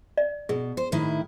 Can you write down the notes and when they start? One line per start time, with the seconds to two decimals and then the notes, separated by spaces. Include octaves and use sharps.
0.17 D5
0.49 B2 G#4
0.77 C5
0.92 A2 D#3 E4